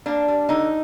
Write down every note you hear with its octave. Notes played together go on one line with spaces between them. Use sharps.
A#3 D4
G3
D3 D#4